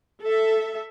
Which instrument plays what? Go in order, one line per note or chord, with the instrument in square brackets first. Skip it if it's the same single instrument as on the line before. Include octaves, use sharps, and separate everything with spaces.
[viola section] A4 E5